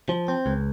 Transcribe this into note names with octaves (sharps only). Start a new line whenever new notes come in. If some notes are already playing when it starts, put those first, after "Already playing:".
F3
C4
C#2